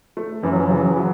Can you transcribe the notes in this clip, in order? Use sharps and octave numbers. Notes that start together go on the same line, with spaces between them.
A3
F#2 E3
F#3
E3
C#3 F#3
E3
F#3
E3
F#3